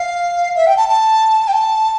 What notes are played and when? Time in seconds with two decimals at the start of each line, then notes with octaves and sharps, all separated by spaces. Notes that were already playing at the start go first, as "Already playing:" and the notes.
Already playing: F5
0.56 E5
0.67 G5
0.77 A5
0.89 A5
1.48 G5
1.53 A5